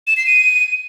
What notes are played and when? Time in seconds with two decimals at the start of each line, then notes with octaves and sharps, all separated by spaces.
0.07 E7
0.17 C7
0.27 D#7